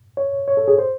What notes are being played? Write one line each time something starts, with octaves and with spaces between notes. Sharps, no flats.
C#5
C#5
A4
G#4
C5